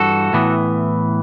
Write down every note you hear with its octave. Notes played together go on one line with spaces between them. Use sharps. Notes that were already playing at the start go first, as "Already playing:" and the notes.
Already playing: G2 E3 G3 F#4 A4
A2 E3 B3